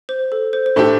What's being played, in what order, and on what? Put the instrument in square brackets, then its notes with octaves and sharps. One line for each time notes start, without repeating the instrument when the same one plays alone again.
[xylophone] C5
A4
C5
C5
[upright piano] A2 A3 D4 G4 [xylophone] A4